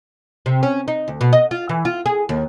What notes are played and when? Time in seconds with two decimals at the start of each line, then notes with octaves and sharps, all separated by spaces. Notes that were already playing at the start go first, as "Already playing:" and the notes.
0.46 C3
0.63 C#4
0.88 D#4
1.08 D2
1.21 B2
1.33 D#5
1.51 F4
1.69 E3
1.85 F4
2.06 G#4
2.29 D#2